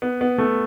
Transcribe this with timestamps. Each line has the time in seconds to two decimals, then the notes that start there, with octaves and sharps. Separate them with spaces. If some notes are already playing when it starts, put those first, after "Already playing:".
0.02 B3
0.21 B3
0.38 A3